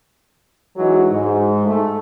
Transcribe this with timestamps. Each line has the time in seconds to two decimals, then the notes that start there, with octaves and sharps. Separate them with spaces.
0.77 E3 F#3 G#3 D#4 F#4
1.10 G#2
1.65 A3